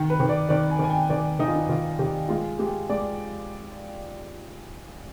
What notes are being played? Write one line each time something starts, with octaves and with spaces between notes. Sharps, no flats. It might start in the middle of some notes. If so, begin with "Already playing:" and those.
Already playing: D#3
B4
D#3
D5
D#3 D5
G#5
D#3
G#5
G5
D#3 D5
D#3 D#4
F4
D#4
D#3 F4
D#3 G4
G#3 F4
G#3 G4
G#3 D5